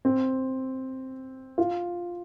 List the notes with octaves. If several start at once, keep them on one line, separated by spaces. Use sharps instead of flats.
C4
F4